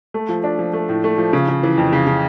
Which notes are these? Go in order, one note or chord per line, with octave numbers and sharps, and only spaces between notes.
A3
F3
D4
F3
A3
A2
A3
F3
C#3
C#3
E3
F2
C#3
C#3